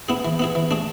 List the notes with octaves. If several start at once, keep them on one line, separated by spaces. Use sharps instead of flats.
B3 E4 G#4
E3
B3 E4 G#4
E3
A3 D4 G#4